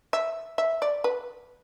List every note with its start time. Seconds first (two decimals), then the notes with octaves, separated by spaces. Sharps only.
0.13 E5
0.58 E5
0.82 D5
1.04 B4